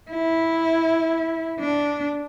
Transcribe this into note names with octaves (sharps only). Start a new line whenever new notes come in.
E4
D4